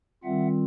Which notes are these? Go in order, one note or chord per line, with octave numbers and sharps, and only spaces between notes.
D#3 G3 C4 F4 E5 F#5